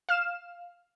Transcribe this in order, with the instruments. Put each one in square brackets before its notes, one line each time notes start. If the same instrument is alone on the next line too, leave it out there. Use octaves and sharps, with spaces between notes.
[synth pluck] F5 F6 E7